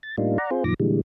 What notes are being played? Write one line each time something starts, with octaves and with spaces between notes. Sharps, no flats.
A6
A2 G3 A#3 D4 D#4 F4
D5 F#5 A#5
C4 F4 G#4 C5
F#2 A#2 D#3 F3 D6 A#6
A#2 D3 E3 G3 G#3